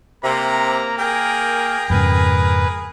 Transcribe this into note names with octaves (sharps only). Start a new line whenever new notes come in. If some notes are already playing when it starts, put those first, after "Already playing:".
C3 A#3 A#5
G#4 A#4 G5
F2 G#2 C#3 B4